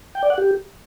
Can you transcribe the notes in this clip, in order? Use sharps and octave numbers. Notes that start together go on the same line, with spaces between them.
G5
D5
F#5
G4